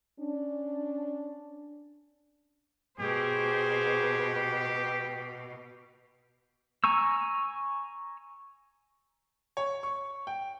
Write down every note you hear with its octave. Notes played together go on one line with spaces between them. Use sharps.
C#4 D4
B2 G4 G#4 C5
G#5 A#5 C#6 E6
C#5
C#6
G5